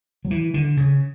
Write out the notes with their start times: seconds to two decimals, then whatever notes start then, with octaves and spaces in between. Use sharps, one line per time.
0.25 F#3
0.31 E3
0.54 D3
0.77 C#3